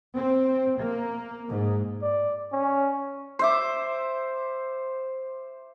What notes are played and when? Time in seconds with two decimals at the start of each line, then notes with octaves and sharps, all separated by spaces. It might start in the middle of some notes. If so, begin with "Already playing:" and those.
0.15 C4
0.78 A#3
1.49 G#2
2.02 D5
2.52 C#4
3.39 C5 E5 D6